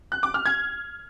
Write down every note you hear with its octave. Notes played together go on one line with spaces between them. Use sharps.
F#6
D6
F6
G#6